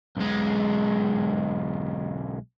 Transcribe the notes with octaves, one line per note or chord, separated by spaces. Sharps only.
B1 G#3